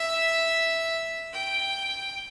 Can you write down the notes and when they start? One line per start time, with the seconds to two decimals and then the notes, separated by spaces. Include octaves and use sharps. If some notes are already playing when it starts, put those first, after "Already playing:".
Already playing: E5
1.33 G5